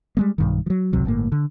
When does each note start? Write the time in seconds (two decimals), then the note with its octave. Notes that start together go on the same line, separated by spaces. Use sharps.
0.17 G3 G#3 A#3
0.38 B1 G2 D#3
0.66 F3 F#3
0.93 G#1 C#2 C3 F#3
1.05 G1 A2 A#3
1.32 D3